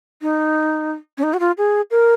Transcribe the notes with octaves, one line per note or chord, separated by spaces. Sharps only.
D#4
C#4
D#4
F#4
F4
G#4
A#4